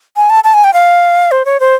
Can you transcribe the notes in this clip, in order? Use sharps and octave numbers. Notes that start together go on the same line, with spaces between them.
G#5
A5
A5
G#5
G5
F5
C5
C#5
C5